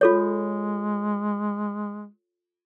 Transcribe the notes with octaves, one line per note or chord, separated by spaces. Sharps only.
G#3 F4 A4 C#5